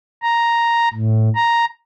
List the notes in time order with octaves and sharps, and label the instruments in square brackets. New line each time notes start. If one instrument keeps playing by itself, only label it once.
[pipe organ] A#5
A2
A#5